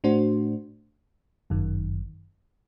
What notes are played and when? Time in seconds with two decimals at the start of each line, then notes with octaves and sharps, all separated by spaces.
0.04 A2 A3 D4 F#4 C5
1.50 G1 F#2 D#3